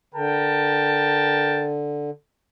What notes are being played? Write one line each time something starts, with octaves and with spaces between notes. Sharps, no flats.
D3 A#4 G5 A5